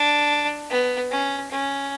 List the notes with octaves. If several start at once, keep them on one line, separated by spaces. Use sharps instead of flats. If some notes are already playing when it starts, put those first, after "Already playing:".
Already playing: D4
B3
C#4
C#4